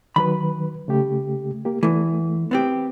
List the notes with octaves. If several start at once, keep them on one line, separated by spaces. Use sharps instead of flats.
D#3 F#3 B4 B5
C#3 A3 G4
A#3 G4
E2 E3 A3
B3 C4 G4